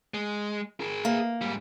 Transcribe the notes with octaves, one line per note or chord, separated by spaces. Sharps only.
G#3
G#4 A#4
A#3
G#2 G3